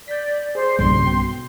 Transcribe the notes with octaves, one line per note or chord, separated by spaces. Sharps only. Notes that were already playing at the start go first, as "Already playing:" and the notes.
D5 G6 B6
G#4 C5 D5
B1 G2 A#2 C#3 G3 C6
B2 G5